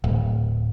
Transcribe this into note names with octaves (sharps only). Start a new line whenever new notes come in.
D1